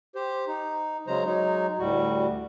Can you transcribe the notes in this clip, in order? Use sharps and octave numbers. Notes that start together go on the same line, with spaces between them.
G4 C5
D#4
C#3 F#3 G#3 C5 A#5
F#3 G#3 D#4
D2 A2 G3 F#4